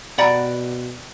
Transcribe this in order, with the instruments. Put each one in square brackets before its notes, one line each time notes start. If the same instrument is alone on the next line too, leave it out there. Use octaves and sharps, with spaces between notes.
[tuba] B2 [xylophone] D5 B5 A6 [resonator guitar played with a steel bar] F#5 G5 A#5